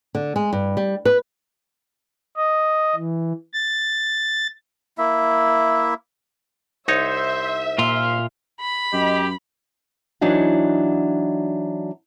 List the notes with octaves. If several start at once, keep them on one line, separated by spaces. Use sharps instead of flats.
D3
G#3
G2
G3
B4
D#5
E3
A6
A#3 E4 E5
C2 D#4 C5 C#5 E5
A#2 F4 F5
B5
F#2 G4 D#5
E3 F#3 D4 D#4 F#4